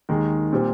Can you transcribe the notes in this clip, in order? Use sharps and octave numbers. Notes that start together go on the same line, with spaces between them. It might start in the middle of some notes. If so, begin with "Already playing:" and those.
D#2 D#3 G#3
A#2 G3 C4